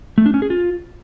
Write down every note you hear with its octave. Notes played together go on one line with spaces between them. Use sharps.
A3
D4
C#4
G#4
F4